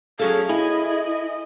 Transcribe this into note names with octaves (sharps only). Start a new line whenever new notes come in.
F#3 C#4 G#4 A4 F5
E4 D#5 G#5